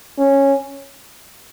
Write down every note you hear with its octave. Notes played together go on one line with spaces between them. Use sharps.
C#4